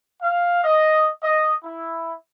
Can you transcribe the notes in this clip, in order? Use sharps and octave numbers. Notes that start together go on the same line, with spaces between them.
F5
D#5
D#5
E4